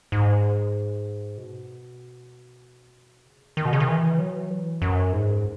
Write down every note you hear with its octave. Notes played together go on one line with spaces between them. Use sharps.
G#2
B2
C#3
D#3
B2
C#3
D#3
E3
F#3
E3
F#2
G#2